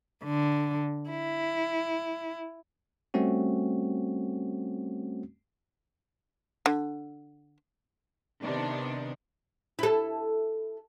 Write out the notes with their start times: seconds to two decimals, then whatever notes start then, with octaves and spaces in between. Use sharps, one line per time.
0.24 D3
1.09 E4
3.14 G3 A3 C4 C#4 F#4
6.66 D3
8.42 C3 D#3 B3 D4
9.79 E4 A4